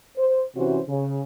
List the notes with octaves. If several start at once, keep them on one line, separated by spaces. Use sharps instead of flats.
C5
C3 E3 C#4 F#4 C5
C#3